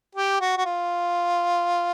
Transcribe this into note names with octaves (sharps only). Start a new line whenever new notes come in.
G4
F#4
F#4
F4